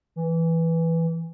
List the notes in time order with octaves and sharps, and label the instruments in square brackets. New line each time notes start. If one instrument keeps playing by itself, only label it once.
[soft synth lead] E3